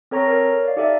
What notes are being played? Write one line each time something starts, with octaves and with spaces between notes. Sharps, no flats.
C4 A4 C#5 A#5 C#6 A#6
A#4 C#5
D5 F5
D#4 G4 A4 D5 E5